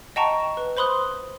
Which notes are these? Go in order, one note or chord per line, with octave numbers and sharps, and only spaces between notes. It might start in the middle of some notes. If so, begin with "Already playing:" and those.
D#5 F#5 G5 A5 A#5 C#6
B4
C5 B5 C6 D#6 F#6